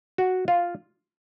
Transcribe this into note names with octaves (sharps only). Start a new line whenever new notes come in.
F#4
F4